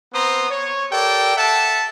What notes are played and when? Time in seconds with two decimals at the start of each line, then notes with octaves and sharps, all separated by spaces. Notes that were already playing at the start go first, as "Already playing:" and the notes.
0.14 B3 C4 C5 A#5 D#6
0.50 C#5
0.92 G4 A4 A#4 D5 G5
1.36 A4 E5 F#5 A5